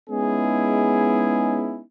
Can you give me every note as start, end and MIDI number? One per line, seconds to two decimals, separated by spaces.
0.10 1.81 56
0.10 1.81 59
0.10 1.81 61
0.10 1.81 63
0.10 1.81 64
0.10 1.81 68